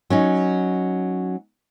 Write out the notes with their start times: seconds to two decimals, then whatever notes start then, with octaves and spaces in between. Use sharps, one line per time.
0.10 F#3 C#4 D#4